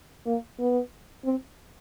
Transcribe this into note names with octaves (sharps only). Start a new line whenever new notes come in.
A#3
B3
C4